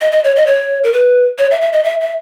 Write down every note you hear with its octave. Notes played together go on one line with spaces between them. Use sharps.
D#5
D#5
C#5
D#5
C#5
A#4
B4
C#5
E5
E5
D#5
E5
E5